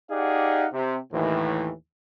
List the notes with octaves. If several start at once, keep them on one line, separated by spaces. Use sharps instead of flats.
D#4 G4 G#4 D5 F5 F#5
C3
D#2 A2 E3